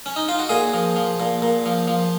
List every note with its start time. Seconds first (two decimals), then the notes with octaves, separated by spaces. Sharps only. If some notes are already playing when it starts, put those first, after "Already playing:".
0.06 C#4
0.16 D#4
0.29 F4
0.39 F#4
0.49 A#2 G#4
0.74 F3
0.96 F3
1.20 A#2
1.42 A#2
1.66 F3
1.88 F3